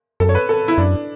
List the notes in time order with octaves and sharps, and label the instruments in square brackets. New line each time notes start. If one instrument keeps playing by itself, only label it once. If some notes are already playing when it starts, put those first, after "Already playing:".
[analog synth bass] F#2 [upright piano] A4
[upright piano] C#5
B4
A4
E4
[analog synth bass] F#2 [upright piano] D4